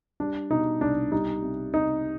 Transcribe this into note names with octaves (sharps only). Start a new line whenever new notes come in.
G3 D4
B2 D#4
C2 D4
G3 D#4
C3
C3 D#4